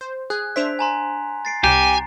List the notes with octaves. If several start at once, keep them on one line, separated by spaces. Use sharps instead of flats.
C5
G#4 F#6 G#6
D4 C5 E5 B6 D7 F7
G#5 A#5 C6
A6 C7 D7
C2 C3 G4 G#5 A#5